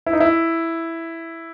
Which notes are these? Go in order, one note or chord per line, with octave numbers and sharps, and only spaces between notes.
E4
D#4
E4